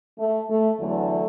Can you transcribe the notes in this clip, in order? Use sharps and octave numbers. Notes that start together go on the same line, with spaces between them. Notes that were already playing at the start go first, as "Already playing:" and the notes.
A3
A3
E2 D3 F#3 A3